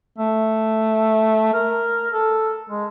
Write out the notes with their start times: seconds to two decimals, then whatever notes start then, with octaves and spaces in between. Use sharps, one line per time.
0.18 A3
1.54 A#4
2.13 A4
2.69 G#3